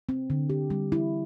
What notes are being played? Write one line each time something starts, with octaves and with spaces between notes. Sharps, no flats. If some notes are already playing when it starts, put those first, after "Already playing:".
C4
D3
G4
G3
E4